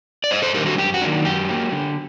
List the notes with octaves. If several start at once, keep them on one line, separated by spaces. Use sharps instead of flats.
D5
G2 C5 D#5
A4 C5
D#3 G3 D4 G4 A#4
F#4 A4
F#2 G4
F#4
D#3 F#3 A#3 D4
F#2 G4
F#3 A#3
D3